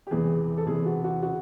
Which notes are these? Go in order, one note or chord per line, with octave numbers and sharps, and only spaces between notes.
G4
E2 C3 E3 G#4
A4
E2 C3 E3 G#4
F#4
F#4
C#3 F#4